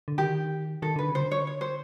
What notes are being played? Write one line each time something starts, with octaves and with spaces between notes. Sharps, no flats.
D3
D#3 G4
D#3 A4
D3 B4
C#3
C5
D3
C#5
C#5
C5